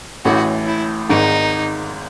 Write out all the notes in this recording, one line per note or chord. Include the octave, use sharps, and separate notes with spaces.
A1 A2 E3 F#4
E4
G#1 G#2 D#3 D#4